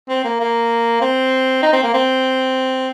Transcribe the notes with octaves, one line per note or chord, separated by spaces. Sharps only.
C4
A#3
A#3
C4
D#4
C4
A#3
C4